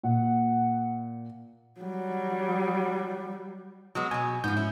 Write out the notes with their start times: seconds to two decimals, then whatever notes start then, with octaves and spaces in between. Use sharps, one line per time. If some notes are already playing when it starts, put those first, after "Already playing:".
0.03 A#2 F#5
1.80 F#3 G3
3.95 F#3 G#3 B3
4.11 B2 F#3 G#5
4.44 G#2 F3 B3 G6
4.57 C#4 E4